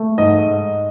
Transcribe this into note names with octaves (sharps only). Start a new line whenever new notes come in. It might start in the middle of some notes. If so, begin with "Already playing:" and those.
Already playing: A3
G#2 D#5